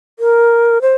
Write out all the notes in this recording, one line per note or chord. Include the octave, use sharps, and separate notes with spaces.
A#4
C5